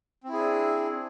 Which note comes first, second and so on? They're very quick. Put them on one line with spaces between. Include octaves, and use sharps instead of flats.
C4 E4 G#4 D4